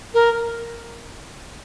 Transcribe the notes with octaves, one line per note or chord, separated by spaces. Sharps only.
A#4